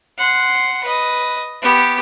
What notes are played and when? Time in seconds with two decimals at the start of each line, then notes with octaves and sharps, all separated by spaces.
0.18 F#5 C6
0.84 B4 D#5
1.62 B3 G4